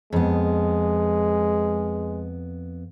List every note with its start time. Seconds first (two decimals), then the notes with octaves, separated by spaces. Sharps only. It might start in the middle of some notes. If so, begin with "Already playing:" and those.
0.13 F2 G#3 B3